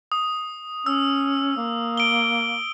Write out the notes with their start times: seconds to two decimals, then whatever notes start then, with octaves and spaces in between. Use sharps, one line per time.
0.12 D#6
0.86 C#4 E6
1.57 A#3
1.97 D7 G7